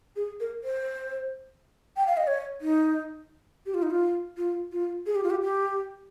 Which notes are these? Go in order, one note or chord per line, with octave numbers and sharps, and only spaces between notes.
G#4
A#4
C5
G5
F5
D#5
C#5
D#4
G4
F4
D#4
F4
F4
F4
G#4
G4
F4
G4
G4